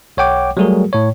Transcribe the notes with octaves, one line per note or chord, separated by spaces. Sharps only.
B1 C#5 F#5 G5 D6
F#3 G3 A3 F#4 G#4 A#4
A2 C#5